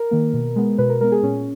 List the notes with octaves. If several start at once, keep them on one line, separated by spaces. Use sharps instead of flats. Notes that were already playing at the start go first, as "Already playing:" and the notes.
Already playing: A#4
D#3 A#3
B2
G#3 B3
B2 B4
A#4
G#3 B3 A#4
G#4
A#2 C#4